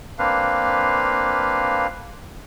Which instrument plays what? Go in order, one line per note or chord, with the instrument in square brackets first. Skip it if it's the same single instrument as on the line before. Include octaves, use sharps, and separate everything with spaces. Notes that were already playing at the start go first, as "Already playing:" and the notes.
[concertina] A#3 C4 D4 B4 F5